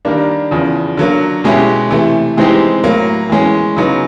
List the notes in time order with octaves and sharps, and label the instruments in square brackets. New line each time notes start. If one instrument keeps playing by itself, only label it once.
[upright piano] D#3 G3 A#3 D4
E2 C#3 F3
D3 F#3 A#3
B2 G#3 C#4 E4 G4
C3 E3 A3
E3 G#3 C4 D#4 G4
A2 F#3 A#3
E3 G#3 C#4
C#3 F#3 B3 D#4